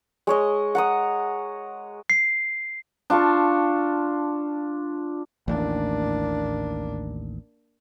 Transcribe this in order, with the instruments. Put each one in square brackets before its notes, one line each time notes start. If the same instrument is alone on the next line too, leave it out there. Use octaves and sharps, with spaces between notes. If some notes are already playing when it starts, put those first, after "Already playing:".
[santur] G#3 C#5 D#5
F#5 A#5 D#6
[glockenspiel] C7
[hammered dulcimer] D4 F4 A5 C#6
[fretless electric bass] A1 D#2 [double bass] A#3 D4